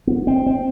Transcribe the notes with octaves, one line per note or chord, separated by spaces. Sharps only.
B3
C4
C4